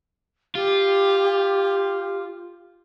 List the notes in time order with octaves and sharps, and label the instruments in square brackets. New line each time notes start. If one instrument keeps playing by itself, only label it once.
[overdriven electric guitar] F4 [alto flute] G4